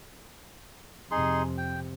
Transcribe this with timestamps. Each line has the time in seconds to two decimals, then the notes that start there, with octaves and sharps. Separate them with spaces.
1.11 F2 C3 D#4 G#4 C6
1.58 G5